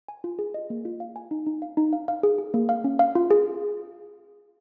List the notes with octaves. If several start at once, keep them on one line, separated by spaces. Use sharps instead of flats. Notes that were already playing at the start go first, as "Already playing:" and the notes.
G#5
F4
G#4
D#5
A#3
F4
F5
G#5
D#4
D#4
F5
D#4
F5
F5
G#4
G#4
A#3
F5
C#4
F5
F4
G#4